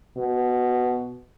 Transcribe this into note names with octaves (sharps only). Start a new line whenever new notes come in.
B2